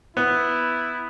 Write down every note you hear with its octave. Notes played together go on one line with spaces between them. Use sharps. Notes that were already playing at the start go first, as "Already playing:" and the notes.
B3 E4